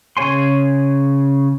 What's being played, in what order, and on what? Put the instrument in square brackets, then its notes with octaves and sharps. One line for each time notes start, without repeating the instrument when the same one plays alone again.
[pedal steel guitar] C#3 G#4 C#5 G#5 C6